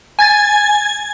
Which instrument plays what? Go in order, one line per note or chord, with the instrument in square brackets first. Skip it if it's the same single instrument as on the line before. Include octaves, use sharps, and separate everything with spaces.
[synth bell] G#5 G#6 A6